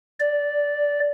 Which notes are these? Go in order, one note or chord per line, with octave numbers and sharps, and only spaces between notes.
D5